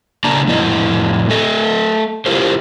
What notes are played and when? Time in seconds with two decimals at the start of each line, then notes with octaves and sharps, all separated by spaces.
0.24 C#3 A#3 D4 D5 A5 A#5
0.48 F2 A2 E4 D#5
1.30 A3 A4 D#5 E5
2.26 E4 F4 G4 A#4 C5